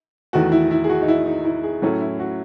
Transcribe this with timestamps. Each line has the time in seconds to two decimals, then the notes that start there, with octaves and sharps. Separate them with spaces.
0.33 E2 D#3 A3 F#4
0.52 E4
0.71 E4
0.84 G#4
0.89 F#4
1.02 D#4
1.08 E4
1.26 D#4
1.45 E4
1.63 G#4
1.82 A2 F#3 A3 C#4
2.01 E4
2.19 F#4